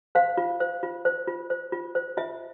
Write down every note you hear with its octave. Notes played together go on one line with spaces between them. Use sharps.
C5 F5
F4
C5
F4
C5
F4
C5
F4
C5
F4 E5